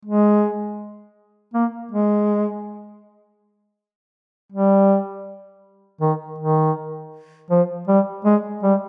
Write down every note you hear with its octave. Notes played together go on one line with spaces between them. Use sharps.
G#3
A#3
G#3
G3
D#3
D#3
F3
G3
G#3
G3